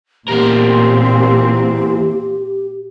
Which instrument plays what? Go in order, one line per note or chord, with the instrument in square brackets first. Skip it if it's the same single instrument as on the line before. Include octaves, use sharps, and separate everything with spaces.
[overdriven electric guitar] E2 A#4 [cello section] A#2 C4 [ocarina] G4